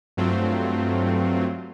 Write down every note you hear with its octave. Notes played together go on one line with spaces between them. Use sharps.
G2 F#3 A3 C4 F4